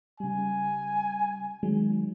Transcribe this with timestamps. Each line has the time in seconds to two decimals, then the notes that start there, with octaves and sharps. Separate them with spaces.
0.20 C#3 G3 G#5
1.63 D#3 F#3 G#3